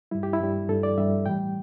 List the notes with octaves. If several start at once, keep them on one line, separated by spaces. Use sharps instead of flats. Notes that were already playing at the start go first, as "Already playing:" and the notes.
G2 G3 E4
G4
E4
G2 G3
G2 G3 A4
D5
G2 G3 E5
A2 E3 G3 G5